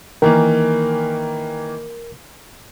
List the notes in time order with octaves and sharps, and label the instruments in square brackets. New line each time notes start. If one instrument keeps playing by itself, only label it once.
[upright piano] D#3 E3 A#3 [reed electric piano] A#4